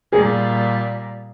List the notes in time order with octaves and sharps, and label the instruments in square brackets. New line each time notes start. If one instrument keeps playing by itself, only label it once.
[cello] A#2 G3 [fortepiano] G#4